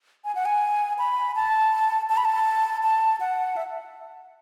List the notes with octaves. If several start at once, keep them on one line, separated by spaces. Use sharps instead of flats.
G#5
F#5
G#5
B5
A5
A5
B5
A5
A5
F#5
E5